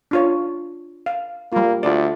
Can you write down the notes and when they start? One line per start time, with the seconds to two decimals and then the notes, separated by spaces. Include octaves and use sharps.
0.11 D4 F4 C#5
1.06 F5
1.52 G3 A#3 F4
1.83 D2 F4 D5